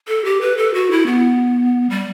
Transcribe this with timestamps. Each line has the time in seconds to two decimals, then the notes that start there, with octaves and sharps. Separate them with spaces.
0.08 A4
0.25 G4
0.41 B4
0.57 A4
0.74 F#4
0.91 E4
1.07 B3
1.90 G3